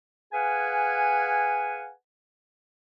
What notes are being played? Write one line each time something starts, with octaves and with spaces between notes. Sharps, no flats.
G#4 B4 F5 F#5 G#5